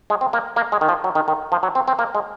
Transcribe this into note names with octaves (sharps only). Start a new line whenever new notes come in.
G#3
C4
A#3
A#3
G#3
D#3
F3
F#3
D#3
D#3
F3
F#3
C4
C4
A#3
G#3